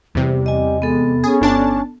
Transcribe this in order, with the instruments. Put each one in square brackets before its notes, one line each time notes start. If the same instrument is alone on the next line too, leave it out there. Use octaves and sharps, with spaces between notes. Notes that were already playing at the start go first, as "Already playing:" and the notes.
[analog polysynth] E2 C3 [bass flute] G3
[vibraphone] D#5 G#5
[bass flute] G#3 [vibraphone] B3 A4
[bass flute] C#4 [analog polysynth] G#4
[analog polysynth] G1 D4 A5